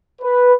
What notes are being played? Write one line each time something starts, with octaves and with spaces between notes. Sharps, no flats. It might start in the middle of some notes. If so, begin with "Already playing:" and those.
B4